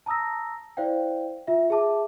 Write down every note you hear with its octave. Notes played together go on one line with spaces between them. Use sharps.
A5 A#5 D#6 E6 A#6
E4 C5 D5 F5 G5
F4 E5
G#4 E5 A5 D6